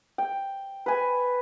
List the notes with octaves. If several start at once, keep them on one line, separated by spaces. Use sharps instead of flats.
G5
B4 G#5